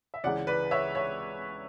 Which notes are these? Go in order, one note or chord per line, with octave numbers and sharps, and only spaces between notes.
E5
C#2 C#3 E3 D5 F#5
B4 D5
C#5 E5
C#5 E5